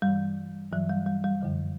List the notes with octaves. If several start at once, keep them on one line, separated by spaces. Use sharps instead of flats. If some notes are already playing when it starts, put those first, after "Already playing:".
G2 G3
E3
G2 E3 F#3
G3
G3
G3
F#2 D3 F3